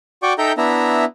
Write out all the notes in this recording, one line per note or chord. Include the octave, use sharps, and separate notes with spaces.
F#4 D5 G5 C#6 D6
D#4 A4 E5 G5 A#5 G6
B3 D4 E4 E5 A#5